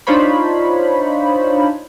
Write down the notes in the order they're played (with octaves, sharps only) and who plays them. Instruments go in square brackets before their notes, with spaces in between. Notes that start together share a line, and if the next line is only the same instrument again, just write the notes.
[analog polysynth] D4 D#4 F4 C5 C#5 B5